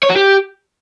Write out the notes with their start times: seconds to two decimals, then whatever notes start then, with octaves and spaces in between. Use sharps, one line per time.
0.03 C#5
0.10 F#4
0.16 G4